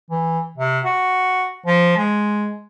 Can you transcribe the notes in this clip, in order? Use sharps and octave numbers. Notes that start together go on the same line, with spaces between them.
E3
C3
F#4
F3
G#3